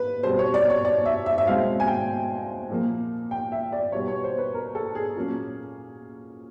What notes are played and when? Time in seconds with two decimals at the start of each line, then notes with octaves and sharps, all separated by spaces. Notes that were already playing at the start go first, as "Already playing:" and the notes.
Already playing: B4
0.23 B2 G3 C4 C5
0.39 C#5
0.54 D5
0.70 C#5
0.85 D5
1.06 E5
1.26 E5
1.38 E5
1.47 B2 G#3 C4 F5
1.80 G#5
1.88 G5
2.70 A#2 F3 A#3
3.31 G5
3.52 E5
3.72 D5
3.92 B2 G3 B3 C#5
4.08 C#5
4.24 C5
4.38 B4
4.54 A#4
4.75 A4
4.95 G#4
5.16 A#2 F#3 A#3 C#4